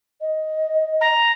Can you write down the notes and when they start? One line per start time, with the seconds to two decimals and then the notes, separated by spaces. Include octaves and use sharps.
0.21 D#5
1.01 A#5